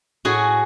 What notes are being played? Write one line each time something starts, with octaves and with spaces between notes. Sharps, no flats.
A2 F#4 G#4